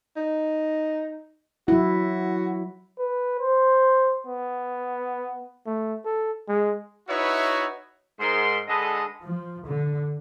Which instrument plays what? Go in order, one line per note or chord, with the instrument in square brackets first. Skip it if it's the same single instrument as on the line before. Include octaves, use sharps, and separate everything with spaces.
[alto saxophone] D#4
[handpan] F#3 E4 [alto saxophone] F#4
[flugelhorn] B4
C5
B3
A3
A4
G#3
[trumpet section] D#4 E4 F#4 B4 C#5 E5
[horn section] G#2 A#4 C6
D3 G#3 A4 B4 D#5
[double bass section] F3
D3